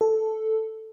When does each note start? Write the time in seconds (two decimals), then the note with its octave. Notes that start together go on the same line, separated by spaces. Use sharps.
0.01 A4